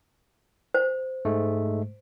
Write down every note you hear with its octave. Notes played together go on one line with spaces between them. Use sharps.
C5
G#2 G#3 A3